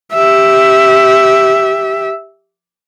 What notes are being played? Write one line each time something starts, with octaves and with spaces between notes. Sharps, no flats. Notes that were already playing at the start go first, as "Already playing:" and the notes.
G4 E5